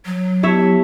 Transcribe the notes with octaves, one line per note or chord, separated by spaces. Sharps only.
F#3
B3 E4 G4 C#5 E5 A5